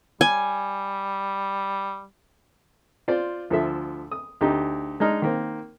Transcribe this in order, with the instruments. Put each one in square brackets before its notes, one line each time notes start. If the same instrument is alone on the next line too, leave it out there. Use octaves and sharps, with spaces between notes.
[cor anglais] G3 [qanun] G#5
[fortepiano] F4 C5 D5
D2 F3 A4 E5
D#6
D2 D#4 G4
G#3 D4 D#4 F6
D#3 A#3 C4